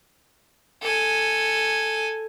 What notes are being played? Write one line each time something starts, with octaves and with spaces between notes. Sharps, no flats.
A4 G#5